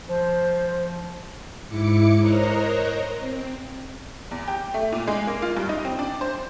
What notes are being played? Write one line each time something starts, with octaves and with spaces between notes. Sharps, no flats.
F3 C5
G#2 E4 D6 C#7
A#4 C5 C#5 D#5 A#5 F#6
C4
E2
G4
A3
A#2
G#3
A#3
F4
G2
D#4
C4
D4
C5